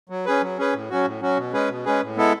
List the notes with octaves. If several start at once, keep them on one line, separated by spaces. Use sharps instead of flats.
F#3
C#4 G#4 B4
F#3
C#4 G#4 B4
A2
F#3 C#4 F#4
A2
F#3 C#4 F#4
B2
G#3 C#4 G#4 B4
B2
G#3 C#4 G#4 B4
A2
G#3 B3 E4 A4